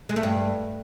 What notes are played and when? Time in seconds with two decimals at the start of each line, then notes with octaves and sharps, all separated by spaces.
0.09 G#3
0.16 A3
0.23 G2